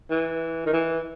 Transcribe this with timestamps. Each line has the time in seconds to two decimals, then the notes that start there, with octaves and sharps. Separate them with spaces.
0.10 E3
0.66 D#3
0.73 E3